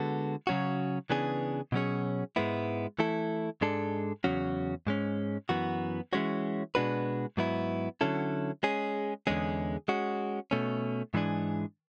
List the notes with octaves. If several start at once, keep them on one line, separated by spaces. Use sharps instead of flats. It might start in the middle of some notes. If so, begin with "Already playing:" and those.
Already playing: D3 G#3 B3 F#4 A4
C#3 F#3 C#4 F#4
C#3 E3 B3 D4 G#4
B2 F#3 C#4 G#4 C#5
G#2 G#3 B3 E4
E3 A3 E4 A4
G#2 G#3 D4 A4
E2 C#3 F#3 C#4 F#4
G#2 G#3 C#4
F#2 E3 B3 F#4
E3 G#3 C#4 F#4 C#5
B2 G#3 D4 F#4 B4
G#2 F#3 B3 E4
D3 F#3 C#4 E4 A4
G#3 C#4 G#4
E2 D3 G#3 C#4 G#4
G#3 C#4 F#4
B2 A3 C#4
G#2 E3 G#3 D4 G#4